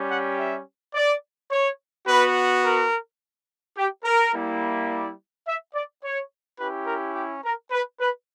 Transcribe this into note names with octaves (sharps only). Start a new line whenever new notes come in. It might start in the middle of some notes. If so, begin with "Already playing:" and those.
Already playing: G3 C#4 G4
F#5
E5
D5
C#5
B3 F#4 B4
A#4
G4
A#4
G3 A#3 E4
D5
E5
D5
C#5
C#4 E4 G4 B4
A#4
G4
A#4
B4
B4